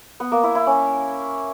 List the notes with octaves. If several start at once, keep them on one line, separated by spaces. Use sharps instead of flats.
B3
A#3
E4
E4
C#4